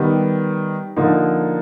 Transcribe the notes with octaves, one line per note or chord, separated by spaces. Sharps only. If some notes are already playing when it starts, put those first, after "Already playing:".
Already playing: D#3 G3 B3
D3 F3 A#3 D#4